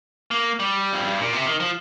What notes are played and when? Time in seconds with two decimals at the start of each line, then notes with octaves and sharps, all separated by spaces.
0.31 A#3
0.60 G3
0.93 F2
1.06 G2
1.19 A#2
1.33 C3
1.46 D#3
1.60 F3